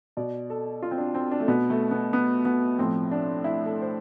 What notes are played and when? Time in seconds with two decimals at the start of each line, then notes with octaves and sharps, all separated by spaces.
0.17 B2 D5
0.50 A4
0.83 F4
0.91 C4
0.98 D4
1.15 C4
1.31 D4
1.40 A3
1.48 B2 B3
1.70 A3
1.91 B3
2.13 B3
2.45 B3
2.78 A2 F3 C4
3.11 D4
3.44 E4
3.66 A4
3.82 C5